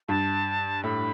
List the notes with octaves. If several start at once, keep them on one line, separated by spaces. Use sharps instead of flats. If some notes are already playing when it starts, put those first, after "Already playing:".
G2 A5
A2 B5